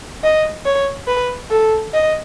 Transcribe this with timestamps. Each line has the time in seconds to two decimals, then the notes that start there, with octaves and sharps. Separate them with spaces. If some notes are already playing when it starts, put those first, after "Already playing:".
0.24 D#5
0.66 C#5
1.08 B4
1.51 A4
1.93 D#5